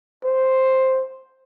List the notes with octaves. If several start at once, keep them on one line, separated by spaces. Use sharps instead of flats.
C5